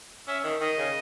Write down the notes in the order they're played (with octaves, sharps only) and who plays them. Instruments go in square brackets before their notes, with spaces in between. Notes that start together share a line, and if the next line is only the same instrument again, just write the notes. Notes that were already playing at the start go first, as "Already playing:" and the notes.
[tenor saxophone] C#4 [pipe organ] E5
[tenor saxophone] D#3
[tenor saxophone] D#3 [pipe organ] D#5
[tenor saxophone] C#3